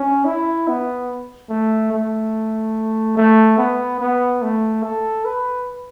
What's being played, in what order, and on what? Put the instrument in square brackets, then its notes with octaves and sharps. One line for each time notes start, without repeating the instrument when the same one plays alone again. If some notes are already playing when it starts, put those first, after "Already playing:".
Already playing: [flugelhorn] C#4
E4
B3
A3
A3
A3
B3
B3
A3
A4
B4